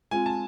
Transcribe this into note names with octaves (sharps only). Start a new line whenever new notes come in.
G#3 C4 F4 G#4 G#5
A5